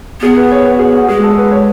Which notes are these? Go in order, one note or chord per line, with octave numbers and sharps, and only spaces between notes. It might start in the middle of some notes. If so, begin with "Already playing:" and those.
B3 G#4
B4
C#5
B4
F#4
G#4
F#4
G#3 G#4
A4
B4
C#5